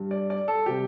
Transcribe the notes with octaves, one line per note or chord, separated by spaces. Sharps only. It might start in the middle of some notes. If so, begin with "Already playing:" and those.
Already playing: G2 G3
D5
D5
A4
C3 G3 G4